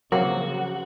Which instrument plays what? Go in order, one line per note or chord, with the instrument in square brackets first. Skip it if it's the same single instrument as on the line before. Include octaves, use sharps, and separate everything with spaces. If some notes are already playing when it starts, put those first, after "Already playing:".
[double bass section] C#3 F3 [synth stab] F#3 A#3 C4 [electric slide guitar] F#4